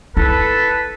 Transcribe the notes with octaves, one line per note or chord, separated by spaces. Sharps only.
E4 A4 B4